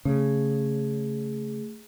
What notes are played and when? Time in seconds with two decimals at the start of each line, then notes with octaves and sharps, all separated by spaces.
0.05 C#3 A3 G#4